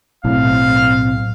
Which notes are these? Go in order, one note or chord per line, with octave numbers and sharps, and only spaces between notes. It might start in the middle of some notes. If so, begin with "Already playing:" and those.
B1 A2 C4 F5